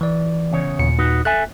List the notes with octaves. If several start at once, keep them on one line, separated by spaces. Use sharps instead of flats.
E3 D5
E2 C#3 C#5
D#2 A#2 C#7
D#4 F#4 B4
A4 E5 G#5 F#6